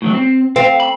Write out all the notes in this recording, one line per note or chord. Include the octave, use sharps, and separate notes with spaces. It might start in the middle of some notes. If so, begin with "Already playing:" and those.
A2 E3 F#3
C4
C4 F5
B5